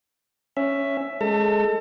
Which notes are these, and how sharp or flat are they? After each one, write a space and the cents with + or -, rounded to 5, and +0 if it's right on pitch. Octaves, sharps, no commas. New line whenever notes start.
C#4 +0 E5 +10
G#3 +10 A4 +15 A5 +45